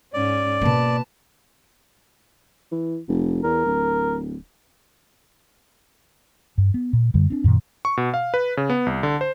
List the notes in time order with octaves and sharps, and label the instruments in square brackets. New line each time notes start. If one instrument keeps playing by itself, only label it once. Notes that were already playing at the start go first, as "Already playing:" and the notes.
[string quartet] G#2 C#4 [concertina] D5
[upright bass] B2 A#3 [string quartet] B4 A5
[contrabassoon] E3
F1
[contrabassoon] E2 [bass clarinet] A#4
[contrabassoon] D1
[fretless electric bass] G2
B3
A#2
F#2 D3 G3
C4 D4
F#2 A#2 D#3
[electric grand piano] C#6
B2
F5
B4
C#3
B3
C2
D3
C5